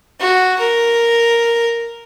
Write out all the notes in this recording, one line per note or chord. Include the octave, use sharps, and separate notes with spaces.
F#4
A#4